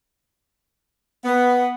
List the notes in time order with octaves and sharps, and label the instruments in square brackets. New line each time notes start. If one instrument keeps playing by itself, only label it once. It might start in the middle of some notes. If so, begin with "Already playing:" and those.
[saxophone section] B3